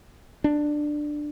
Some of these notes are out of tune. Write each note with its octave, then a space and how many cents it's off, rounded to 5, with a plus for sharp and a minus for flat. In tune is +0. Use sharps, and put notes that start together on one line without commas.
D4 +15